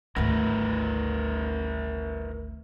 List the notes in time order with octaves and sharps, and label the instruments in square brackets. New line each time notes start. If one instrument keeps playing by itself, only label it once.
[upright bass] G#1 D2 [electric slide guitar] E4 A#4 B4